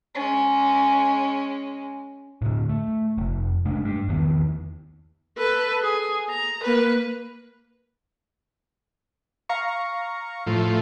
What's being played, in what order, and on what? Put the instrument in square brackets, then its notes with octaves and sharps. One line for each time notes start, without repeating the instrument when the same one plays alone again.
[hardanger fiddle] G#3 C#4
[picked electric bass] A2 D3
A3
F1
G#3 A3 D4
G2
E2 D#3 B3
[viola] A4 B4
G#4
A#5
A#3 B4
[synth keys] F5 A#5 C#6
[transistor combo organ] A2 F3